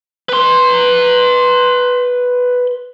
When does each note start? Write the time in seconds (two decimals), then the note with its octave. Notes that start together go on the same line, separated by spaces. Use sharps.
0.29 B4 C6